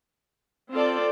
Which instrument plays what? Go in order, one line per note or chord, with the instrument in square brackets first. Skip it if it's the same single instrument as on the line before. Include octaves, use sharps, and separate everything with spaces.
[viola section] C4 F4 A4 D5